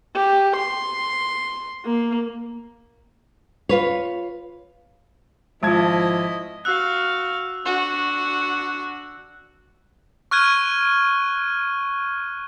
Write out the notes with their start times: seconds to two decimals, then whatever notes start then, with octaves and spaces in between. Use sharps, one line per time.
0.16 G4
0.56 C6
1.85 A#3
3.69 F4 B4 C#5
5.63 G#1 F3 G#3 E4 F4 D#5 A5 G#6
6.65 F#4 F5 E6 F#6
7.65 D4 F#4
10.31 C#6 F6 F#6 G#6 D#7